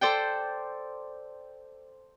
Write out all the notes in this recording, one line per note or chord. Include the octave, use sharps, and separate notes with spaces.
A4 C5 D5 G5